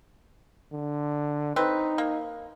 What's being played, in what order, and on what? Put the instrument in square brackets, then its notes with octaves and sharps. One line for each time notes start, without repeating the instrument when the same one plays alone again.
[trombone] D3
[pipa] C4 B4 [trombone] D#4
[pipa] A#3